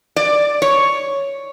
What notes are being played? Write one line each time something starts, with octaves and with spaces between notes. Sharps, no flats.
D5
C#5